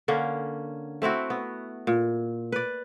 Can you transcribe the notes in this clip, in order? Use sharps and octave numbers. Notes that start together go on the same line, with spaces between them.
D3 A#3 C#4
A3 C4 E4 F#4
B3
A#2
B4 D5